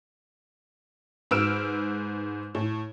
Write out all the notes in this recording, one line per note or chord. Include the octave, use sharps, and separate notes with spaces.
G#2 B4 E6 F6 D7 E7
A2